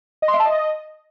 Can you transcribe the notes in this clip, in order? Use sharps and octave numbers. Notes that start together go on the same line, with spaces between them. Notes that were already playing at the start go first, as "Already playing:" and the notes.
D#5
C6
E5
A5
D#5